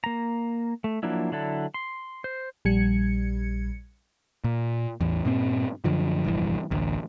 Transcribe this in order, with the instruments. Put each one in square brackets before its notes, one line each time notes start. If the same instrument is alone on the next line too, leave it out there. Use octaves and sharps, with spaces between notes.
[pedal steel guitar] A#3 A#5
A3
F3 F#3 A#3 D4 E4
D3 F#3 D4 E4 A4
C6
C5
[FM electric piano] A#1 G3 G#6 C#7
[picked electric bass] A#2
A1 E2
G2 A#2 C4
F#2 D3 F3
F1 A#1 G2 E3
A1 D2